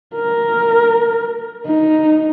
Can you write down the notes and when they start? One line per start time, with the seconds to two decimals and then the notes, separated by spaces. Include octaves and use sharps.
0.15 A#4
1.66 D#4